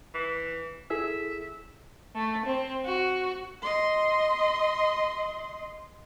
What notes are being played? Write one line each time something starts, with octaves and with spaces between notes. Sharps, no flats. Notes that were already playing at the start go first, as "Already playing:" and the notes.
E3
E4 G#4 A4 E5
A3
C4
F#4
D#5 C6